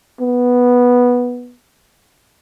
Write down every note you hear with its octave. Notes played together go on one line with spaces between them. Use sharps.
B3